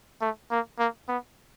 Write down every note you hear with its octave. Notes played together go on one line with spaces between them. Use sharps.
A3
A#3
A#3
B3